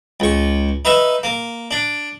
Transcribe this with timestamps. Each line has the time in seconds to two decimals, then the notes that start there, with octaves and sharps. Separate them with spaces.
0.20 C#2 C#6
0.85 D#4 B4 E5
1.23 A#3
1.71 D4